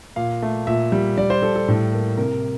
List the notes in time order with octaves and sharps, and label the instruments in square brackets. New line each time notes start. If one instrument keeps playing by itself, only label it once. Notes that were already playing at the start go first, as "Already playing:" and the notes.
[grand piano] A#2 F5
A3
A#2 E5
G3
G3 D5
C5
G3 A4
A4
A2
A#3
C3 A#4